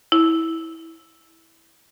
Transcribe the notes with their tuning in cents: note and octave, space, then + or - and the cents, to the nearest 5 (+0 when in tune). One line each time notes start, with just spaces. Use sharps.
E4 -15